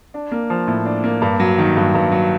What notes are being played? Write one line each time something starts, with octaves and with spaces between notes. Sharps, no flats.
D4
A#3
F3
A2
D4
A#3
G2
F#3
D#3
G2
G2
F#3